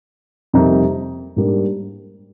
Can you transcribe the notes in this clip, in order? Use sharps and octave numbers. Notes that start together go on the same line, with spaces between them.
F2 C3 G3 A#3 D#4
G#2 G3 A#3 D4